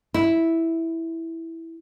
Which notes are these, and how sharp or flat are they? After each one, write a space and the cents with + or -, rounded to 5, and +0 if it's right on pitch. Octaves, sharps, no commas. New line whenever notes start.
E4 -5